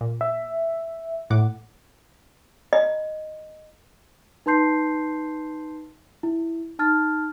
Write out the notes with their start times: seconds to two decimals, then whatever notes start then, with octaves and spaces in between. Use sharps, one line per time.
0.01 A#2
0.21 E5
1.30 A2 F#5 D6
2.73 D#5
4.46 D#4 B4 A5 C6 G6 C7
6.23 E4
6.79 D#4 A5 F6 A6